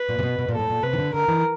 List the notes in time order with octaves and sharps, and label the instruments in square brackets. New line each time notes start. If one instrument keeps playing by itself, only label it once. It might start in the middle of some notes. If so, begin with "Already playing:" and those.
Already playing: [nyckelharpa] B4
[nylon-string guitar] A#2
C3
B2
B2
A#2
[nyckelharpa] A4
[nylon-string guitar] A2
A#2
[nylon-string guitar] C3 [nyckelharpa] B4
[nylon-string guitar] D#3
D3
[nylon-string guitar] D3 [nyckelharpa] A#4
[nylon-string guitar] E3